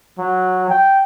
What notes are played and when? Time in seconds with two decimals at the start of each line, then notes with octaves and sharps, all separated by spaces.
0.18 F#3
0.69 G5